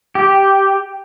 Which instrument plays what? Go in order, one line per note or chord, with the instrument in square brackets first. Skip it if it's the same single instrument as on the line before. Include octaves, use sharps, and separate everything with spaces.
[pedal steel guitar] G4